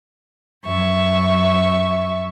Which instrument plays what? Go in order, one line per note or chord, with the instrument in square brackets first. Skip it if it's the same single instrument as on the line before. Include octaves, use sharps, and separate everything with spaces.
[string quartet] F#2 E5 C#6